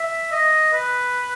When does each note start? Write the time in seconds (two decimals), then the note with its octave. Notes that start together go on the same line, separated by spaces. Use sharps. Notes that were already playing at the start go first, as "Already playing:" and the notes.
Already playing: E5
0.32 D#5
0.73 B4